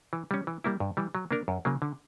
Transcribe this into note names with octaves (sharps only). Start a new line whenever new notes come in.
E3
G3 C#4
E3
G3 A#3 E4
G2
E3 G3
F#3
A#3 D4 A#4
F#2
C#3 F#3 A#3
D3